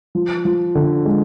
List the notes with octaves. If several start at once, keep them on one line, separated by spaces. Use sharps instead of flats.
F3
F3
D3
G#3